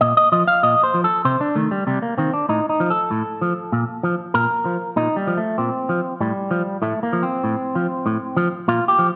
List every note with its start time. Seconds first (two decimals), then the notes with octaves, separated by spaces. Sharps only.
0.01 A#2 D#5
0.17 D#5
0.32 F3 D#5
0.48 F5
0.63 A#2 D#5
0.83 C5
0.94 F3
1.04 A4
1.25 C3 C5
1.41 D4
1.55 D#3 A3
1.71 G3
1.87 C3 G3
2.02 A#3
2.18 D#3 C4
2.33 D4
2.49 A2 D#4
2.69 D#4
2.80 F3
2.90 A4
3.11 A2
3.41 F3
3.72 A#2
4.03 F3
4.34 A#2 A#4
4.65 F3
4.96 A#2 D#4
5.16 G3
5.27 F3
5.37 A3
5.58 A#2 C4
5.89 F3
6.20 A2 G3
6.51 F3
6.82 A2 A3
7.03 A#3
7.13 F3
7.23 C4
7.44 A2
7.75 F3
8.06 A2
8.37 F3
8.68 A#2 F4
8.88 G4
8.99 F3